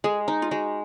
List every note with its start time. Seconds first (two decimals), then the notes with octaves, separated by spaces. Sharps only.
0.04 G#3 G#4
0.28 D#4
0.42 F4
0.51 G#3 F#4